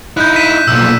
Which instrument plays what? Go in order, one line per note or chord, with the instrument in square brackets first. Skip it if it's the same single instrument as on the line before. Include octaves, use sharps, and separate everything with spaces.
[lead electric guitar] D#4 E4 [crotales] F#6 G6
[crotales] B6 D#7 E7
[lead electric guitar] B1 A#2 [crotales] E6
[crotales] D#7